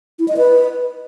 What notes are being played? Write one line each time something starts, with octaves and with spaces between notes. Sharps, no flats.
E4
D#5
B4